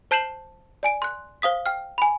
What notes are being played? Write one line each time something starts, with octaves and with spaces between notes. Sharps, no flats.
C5 A5 G6 C7 E7 F#7
D5 G#5 D7
C6 F#6
C5 F5 D#6 B6
G5 F6
G#5 B5